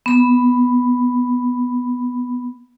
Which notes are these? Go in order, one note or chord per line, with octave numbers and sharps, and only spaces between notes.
B3 B5